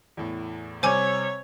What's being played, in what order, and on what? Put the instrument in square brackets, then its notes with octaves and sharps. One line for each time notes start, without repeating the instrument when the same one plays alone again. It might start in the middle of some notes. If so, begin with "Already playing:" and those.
[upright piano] E2 A2
[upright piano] C3 G3 C4 [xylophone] C5 G#5 D6 [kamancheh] C#5